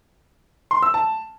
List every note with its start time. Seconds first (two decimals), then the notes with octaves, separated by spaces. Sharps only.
0.71 C6
0.82 E6
0.94 A5